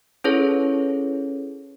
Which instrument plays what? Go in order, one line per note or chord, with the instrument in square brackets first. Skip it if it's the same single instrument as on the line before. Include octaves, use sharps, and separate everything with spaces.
[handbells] C#4 E4 G#4 A4 B4 C#5